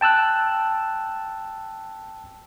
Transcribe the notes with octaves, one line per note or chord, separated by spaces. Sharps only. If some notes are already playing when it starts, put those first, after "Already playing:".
G5 A5 E6 F#6